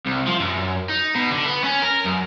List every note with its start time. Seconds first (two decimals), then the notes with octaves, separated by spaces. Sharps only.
0.06 C2
0.27 F3
0.40 F#2
0.89 D#4
1.15 B2
1.31 D3
1.45 B3
1.64 C#4
1.82 A#4
2.06 F#2